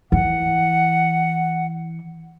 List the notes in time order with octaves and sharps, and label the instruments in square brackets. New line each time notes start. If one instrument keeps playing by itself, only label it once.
[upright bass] E3 [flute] F#5